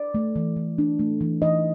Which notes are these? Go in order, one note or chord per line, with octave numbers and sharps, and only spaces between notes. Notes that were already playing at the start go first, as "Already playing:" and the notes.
Already playing: D5
A3
E3
E3
D4
A3
E3
E3 D#5